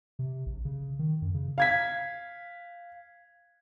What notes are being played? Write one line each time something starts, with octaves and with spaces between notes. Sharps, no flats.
C3
A#1
C#3
D#3
F#2
C#3
F5 G#6 B6